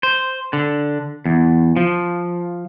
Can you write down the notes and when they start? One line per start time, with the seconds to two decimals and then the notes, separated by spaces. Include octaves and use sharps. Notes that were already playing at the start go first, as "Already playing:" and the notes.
0.03 C5
0.53 D3
1.25 E2
1.76 F3